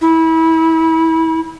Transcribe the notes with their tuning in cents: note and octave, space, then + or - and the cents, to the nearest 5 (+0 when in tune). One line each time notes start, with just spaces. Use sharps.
E4 -25